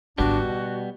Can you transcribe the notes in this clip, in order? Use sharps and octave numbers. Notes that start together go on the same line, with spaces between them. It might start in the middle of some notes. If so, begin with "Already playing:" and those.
G#1 D3 G3 B3 D4 F#4
B2 D3